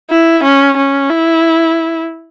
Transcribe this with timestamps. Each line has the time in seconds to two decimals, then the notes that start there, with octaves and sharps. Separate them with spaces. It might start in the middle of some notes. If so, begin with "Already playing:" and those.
0.10 E4
0.43 C#4
0.77 C#4
1.10 E4